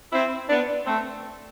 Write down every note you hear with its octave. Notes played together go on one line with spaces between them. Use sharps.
C4 E4
B3 D4
A3 C4